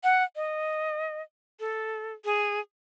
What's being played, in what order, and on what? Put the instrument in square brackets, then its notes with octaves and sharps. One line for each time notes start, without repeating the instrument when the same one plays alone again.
[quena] F#5
D#5
A4
G#4